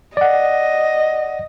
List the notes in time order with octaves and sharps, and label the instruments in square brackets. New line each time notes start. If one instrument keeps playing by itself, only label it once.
[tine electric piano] D5 F#5 [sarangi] D#5